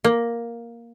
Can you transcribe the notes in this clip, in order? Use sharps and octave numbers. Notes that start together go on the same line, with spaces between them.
A#3